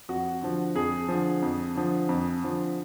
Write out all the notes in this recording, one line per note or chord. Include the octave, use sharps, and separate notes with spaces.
F2 F#4
D3 F3
F2 G#4
D3 F3
F2
D3 F3
F2
D3 F3